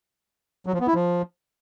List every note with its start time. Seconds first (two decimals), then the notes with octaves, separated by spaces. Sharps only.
0.66 F#3
0.73 F3
0.80 B3
0.87 E4
0.94 F3